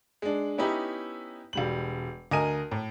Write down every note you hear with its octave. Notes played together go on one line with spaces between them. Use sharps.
G#3 D4
B3 C#4 D#4 E4 G4
E1 G3 F#7
D2 A#4 D#5 G#5 D#7
A2